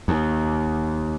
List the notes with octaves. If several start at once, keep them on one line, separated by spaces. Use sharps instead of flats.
D#2